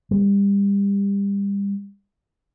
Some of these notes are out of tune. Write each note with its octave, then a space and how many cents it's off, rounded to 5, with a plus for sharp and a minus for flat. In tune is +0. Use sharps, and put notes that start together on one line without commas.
G3 +30